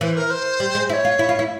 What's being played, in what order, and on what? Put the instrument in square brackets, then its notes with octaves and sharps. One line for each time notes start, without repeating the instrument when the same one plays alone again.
[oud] E3 [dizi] C5
[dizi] A#4
C5
[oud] G3
G#3
[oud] E4 [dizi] E5
[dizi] C#5
[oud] F4
E4
F4
E4